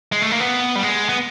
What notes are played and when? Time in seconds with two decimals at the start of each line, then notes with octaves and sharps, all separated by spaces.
0.12 G#3
0.22 A3
0.31 A#3
0.40 B3
0.75 G3
0.83 G#3
1.09 B3